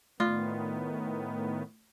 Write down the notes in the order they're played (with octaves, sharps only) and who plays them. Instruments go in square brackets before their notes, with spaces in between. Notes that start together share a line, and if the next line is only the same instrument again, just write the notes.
[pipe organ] A2 D#3 B3 [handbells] A3 [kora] F4